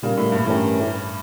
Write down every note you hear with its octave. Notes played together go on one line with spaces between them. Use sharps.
A#2 C#3 G3 A#3
A2
G2
G2 E3 A3 C#4 G4 A#4